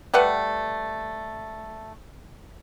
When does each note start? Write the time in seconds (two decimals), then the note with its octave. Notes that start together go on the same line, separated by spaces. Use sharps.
0.14 G3 A3 B4 F#5